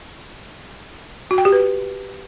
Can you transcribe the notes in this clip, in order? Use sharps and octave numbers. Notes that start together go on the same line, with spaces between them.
F#4
G5
G4
B4